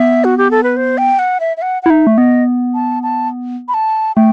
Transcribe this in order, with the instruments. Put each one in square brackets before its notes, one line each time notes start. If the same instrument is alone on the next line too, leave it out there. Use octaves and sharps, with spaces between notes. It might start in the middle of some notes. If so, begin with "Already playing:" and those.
Already playing: [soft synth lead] B3 [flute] E5
[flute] F#4
G4
A4
B4
C5
G5
F#5
E5
E5
F#5
F#5
[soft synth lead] E4
[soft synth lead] D#4 [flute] E5
[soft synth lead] A3
[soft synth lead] B3 [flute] D#5
[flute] A5
A5
B5
A5
[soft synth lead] A3 [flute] G5